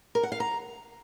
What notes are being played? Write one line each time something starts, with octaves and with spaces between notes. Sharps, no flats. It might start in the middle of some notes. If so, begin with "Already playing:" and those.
A#4
F#5
F5
A#5